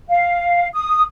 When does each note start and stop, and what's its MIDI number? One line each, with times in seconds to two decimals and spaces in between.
0.08 0.67 77
0.73 1.01 87